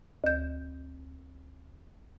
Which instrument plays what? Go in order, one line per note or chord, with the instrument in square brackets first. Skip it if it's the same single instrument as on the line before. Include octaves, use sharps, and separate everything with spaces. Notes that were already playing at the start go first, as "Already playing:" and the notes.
[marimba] D2 G6